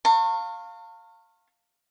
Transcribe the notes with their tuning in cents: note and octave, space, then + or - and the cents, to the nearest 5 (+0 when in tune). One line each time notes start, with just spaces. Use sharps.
F5 +5 A5 +45 C#6 -30